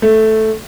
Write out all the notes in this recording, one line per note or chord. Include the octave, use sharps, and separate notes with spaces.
A3